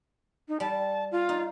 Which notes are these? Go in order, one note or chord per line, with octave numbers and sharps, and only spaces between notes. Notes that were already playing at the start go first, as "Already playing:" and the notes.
D#4
G3 A5
F4
D#4